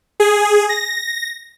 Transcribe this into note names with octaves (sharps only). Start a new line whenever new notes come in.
G#4
A#6